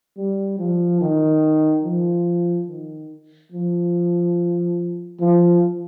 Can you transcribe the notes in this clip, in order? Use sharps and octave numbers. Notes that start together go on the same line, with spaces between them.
G3
F3
D#3
F3
D#3
F3
F3